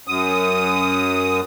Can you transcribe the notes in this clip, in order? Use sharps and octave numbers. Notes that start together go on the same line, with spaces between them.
F#2 D#6